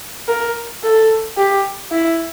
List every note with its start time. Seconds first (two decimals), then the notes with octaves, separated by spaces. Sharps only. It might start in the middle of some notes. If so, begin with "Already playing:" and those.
0.28 A#4
0.83 A4
1.37 G4
1.92 E4